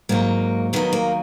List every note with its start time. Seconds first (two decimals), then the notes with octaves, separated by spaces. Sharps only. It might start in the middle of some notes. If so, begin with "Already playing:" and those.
0.09 G#2 F#3 A#3
0.73 D#2 D#3 F#3 B3
0.93 A#3